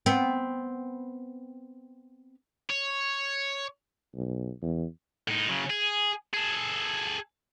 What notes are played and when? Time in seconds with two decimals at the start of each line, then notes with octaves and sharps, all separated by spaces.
0.06 B3 C4
2.70 C#5
4.15 B1
4.62 E2
5.28 A2 D#4
5.49 C#3 F#3
5.70 G#4
6.34 G#4 A4